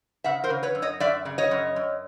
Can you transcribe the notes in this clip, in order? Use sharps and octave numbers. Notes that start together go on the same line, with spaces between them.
C#3 E5 F#5
A#4 C5
C#3
B4 C#5
F#2
C#5 D#5
F#2 D5 E5
C#3
C#5 D#5
F#2
F#2